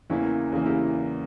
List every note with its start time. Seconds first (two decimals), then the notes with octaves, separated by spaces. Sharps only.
0.10 E2 C#3 E3 A#3 C#4 E4
0.52 E2 C#3 E3 A#3
0.65 E4 G4